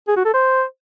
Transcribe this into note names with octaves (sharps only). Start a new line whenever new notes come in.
G#4
F#4
A4
C5